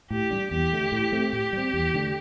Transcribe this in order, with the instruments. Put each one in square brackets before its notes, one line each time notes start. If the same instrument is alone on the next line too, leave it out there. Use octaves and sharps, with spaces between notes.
[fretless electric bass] A2 [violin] G4
[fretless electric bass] G3 D4
[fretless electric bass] E2 [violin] G4
[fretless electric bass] D3 A3
A2
A3 C4
[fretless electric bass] A2 [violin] G4
[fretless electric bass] G3 C4
E2
D3 A3 D4